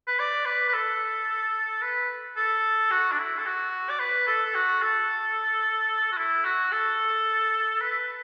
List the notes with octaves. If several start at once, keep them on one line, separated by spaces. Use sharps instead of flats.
B4
D5
B4
B4
A4
B4
A4
F#4
D4
E4
A4
F#4
D5
B4
A4
A4
F#4
A4
F#4
E4
F#4
A4
B4